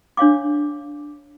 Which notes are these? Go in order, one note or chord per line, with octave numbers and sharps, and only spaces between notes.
D4 C#5 F5 D6